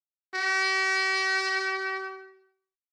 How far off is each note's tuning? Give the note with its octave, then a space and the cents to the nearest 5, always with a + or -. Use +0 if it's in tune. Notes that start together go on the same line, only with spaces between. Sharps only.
G4 -45